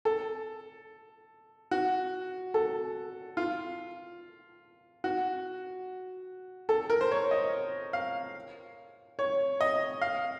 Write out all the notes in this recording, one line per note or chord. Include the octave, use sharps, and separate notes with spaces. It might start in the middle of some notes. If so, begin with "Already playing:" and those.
A4
F#4
A4
F4
F#4
A4
A#4
C5
C#5
D#5
F5
C#5
D#5
F5